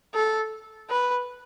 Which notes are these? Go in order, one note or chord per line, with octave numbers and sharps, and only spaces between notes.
A4
B4